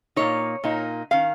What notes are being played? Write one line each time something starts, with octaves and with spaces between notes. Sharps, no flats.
A#2 A#3 D#4 C#5
A#2 A#3 D#4
D#3 C#4 F5